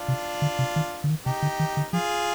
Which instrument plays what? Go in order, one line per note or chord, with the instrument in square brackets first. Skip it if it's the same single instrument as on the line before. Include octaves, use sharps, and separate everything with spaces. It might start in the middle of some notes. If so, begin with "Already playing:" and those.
Already playing: [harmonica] D4 F4
[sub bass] C3
D3
C3
D#3
D3
D#3
[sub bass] C3 [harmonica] D#4 G4
[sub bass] D3
D#3
D3
[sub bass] F3 [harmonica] F4 G#4